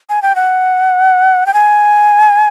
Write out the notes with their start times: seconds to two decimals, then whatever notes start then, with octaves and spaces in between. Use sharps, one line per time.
0.09 G#5
0.22 G5
0.36 F#5
1.46 G5
1.54 G#5